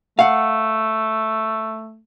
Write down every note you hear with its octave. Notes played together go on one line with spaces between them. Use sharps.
A3 F5 F#5